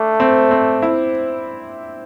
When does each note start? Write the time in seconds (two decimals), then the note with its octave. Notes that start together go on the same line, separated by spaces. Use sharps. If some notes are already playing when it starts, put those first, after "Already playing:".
Already playing: A3 D4
0.20 C4
0.51 C4
0.82 E4